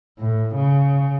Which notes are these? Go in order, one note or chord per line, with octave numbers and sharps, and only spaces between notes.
A2
C#3